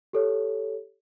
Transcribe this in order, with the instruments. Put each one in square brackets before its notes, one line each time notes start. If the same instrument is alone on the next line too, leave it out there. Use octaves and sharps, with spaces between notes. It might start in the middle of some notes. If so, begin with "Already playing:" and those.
[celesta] G4 A4 C#5